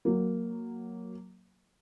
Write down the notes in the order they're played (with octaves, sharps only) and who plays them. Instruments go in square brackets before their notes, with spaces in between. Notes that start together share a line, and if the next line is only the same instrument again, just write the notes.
[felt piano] F#3 A#3